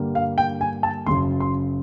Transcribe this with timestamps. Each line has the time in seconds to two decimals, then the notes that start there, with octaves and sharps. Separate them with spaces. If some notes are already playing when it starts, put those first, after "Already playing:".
Already playing: G2 D3 G3 A#3
0.15 F5
0.38 G5
0.61 G#5
0.83 A5
1.06 F#1 F#2 C#3 C6
1.40 C6